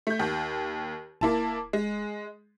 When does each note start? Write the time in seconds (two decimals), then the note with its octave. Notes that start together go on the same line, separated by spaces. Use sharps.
0.07 A3 G6
0.19 D#2
1.21 D1 A#3 E4 A5
1.73 G#3